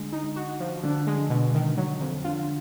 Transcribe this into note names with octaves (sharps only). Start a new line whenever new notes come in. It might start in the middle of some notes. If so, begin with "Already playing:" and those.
Already playing: D3 G#3
D#4
F#4
F3
D3 D4
G#3
D3
B2
D#3
F#3
F2
D3 F4